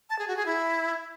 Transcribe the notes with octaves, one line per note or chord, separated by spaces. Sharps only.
A5
G#4
F#4
G#4
E4